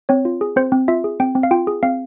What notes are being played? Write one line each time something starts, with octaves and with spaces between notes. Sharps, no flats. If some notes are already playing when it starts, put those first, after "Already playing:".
C4 C#5
F4
G#4
C4 C5
C4
F4 E5
G#4
C4 G5
C4
F5
F4 G5
G#4
C4 F5